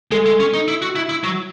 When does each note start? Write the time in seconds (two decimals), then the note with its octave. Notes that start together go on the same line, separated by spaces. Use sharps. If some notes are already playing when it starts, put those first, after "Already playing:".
0.11 G#3 A4
0.26 G#3
0.40 C#4
0.54 D#4
0.68 E4
0.82 F#4
0.95 E4
1.09 E4
1.24 F#3